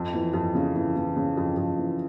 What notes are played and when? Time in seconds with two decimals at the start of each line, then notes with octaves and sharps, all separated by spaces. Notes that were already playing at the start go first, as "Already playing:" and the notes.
Already playing: F2
0.14 E3
0.34 F2
0.55 C#3
0.76 E3
0.96 E3
1.16 C#3
1.37 F2
1.57 F2
1.78 E3